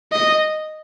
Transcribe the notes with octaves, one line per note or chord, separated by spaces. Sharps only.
D#5